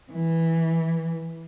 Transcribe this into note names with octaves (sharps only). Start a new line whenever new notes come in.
E3